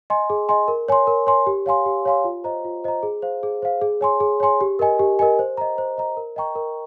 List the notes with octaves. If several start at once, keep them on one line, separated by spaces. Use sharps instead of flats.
D#5 G#5 C6
G#4
D#5 G#5 C6
A#4
C#5 G#5 C6
A#4
C#5 G#5 C6
G4
C#5 F5 G#5 C6
G4
C#5 F5 G#5 C6
F4
C5 D#5 A#5
F4
C5 D#5 A#5
G#4
C5 F5
G#4
C5 F5
G#4
C#5 G#5 C6
G#4
C#5 G#5 C6
G4
A#4 D#5 G#5
G4
A#4 D#5 G#5
C5
D#5 A#5
C5
D#5 A#5
A#4
D#5 G5 A#5 C#6
A#4